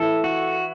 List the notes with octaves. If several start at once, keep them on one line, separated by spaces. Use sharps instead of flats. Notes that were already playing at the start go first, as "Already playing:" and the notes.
Already playing: E3 E4 A4
F#4